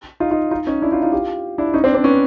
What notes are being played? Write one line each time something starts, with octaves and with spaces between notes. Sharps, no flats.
D#4 F4
D#4 F4
D#4 F4
C#4 D#4
D4 E4
D#4 F4
D#4 F4
F4 G4
D4 E4
C#4 D#4
C4 D4
C4 D4
B3 C#4